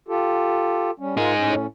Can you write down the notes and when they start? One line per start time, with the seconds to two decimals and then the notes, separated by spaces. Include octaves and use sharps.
0.08 F4 G4 A4
0.99 G3 C#4
1.17 D#4 F4 G#4 A#4
1.37 A2 C#4